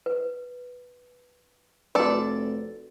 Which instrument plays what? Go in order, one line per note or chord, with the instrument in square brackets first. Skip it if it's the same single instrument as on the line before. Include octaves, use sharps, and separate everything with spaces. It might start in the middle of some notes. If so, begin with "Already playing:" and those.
[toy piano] B4
[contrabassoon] F1 [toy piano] F#4 B4 [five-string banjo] A4 D5